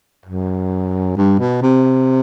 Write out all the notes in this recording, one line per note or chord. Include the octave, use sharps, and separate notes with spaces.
F#2
G2
B2
C3